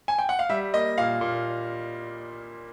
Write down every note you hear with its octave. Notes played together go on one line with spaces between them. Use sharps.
G#5
G5
F#5
F5
G3 E5
A#3 D#5
A#2 F5
A#2